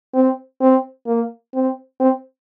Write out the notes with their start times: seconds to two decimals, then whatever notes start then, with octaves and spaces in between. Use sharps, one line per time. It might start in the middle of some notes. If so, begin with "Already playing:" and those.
0.14 C4
0.61 C4
1.07 A#3
1.54 C4
2.00 C4